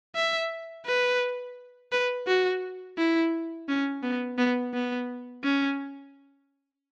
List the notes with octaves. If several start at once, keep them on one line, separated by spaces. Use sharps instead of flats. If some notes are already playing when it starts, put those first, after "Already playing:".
E5
B4
B4
F#4
E4
C#4
B3
B3
B3
C#4